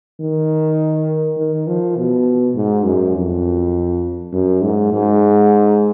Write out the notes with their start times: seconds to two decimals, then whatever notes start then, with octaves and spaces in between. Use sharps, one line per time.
0.21 D#3
1.38 D#3
1.67 F3
1.96 B2
2.55 G#2
2.85 F#2
3.15 F2
4.33 F#2
4.62 G#2
4.92 G#2